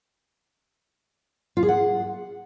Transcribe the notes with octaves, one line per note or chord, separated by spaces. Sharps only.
F4
G#4
F#5